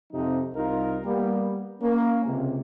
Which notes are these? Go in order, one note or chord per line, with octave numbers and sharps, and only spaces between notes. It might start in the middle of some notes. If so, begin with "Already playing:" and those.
F2 C3 F3 D#4
C2 D#4 F4 A#4
G3 A#3 B3 G4
A#3 C#4
C#2 C3